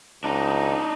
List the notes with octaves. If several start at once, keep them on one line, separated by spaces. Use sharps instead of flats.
C#2 D4 D#4